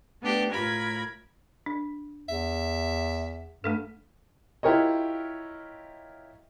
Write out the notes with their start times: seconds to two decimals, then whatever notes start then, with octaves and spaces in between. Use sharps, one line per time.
0.22 A3 B3 D4 G4
0.52 A2 F4 A#4 B5 G#6
1.66 D4
2.28 E2 E5
3.64 G2 A3 D4 A4
4.63 E4 F4 G4 A#4 C#5 D#5